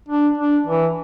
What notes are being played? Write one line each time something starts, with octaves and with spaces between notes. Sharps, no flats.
D4
D4
E3